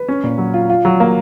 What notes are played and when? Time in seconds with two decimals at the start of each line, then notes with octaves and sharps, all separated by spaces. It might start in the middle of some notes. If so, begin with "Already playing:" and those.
Already playing: B4
0.08 C#4
0.24 A#2
0.38 F#3
0.54 F4
0.69 F4
0.85 F#3
1.00 A#3